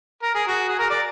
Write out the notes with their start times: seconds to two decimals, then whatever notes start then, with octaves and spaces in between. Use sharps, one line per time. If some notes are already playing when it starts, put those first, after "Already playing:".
0.23 A#4
0.35 G#4
0.47 F#4
0.68 G#4
0.79 A#4
0.90 D5